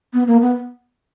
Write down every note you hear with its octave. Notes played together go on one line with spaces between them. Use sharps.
B3
A#3
B3